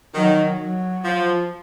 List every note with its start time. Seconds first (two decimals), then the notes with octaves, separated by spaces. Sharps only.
0.15 D#3 F#3
0.60 F#3
1.04 F3